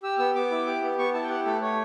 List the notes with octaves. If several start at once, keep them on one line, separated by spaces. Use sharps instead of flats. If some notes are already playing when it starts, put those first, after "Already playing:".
G4 E6
B3 E6
B3 D6
E4
G4
B3
B3 C#6
E4 A5
G5
G4 F#5
A3 A4
A3 C#5